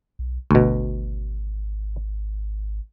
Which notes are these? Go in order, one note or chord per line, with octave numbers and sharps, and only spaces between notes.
B1
G#1 D2 B2